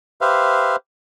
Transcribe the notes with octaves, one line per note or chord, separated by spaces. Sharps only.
G4 B4 C5 E5 F5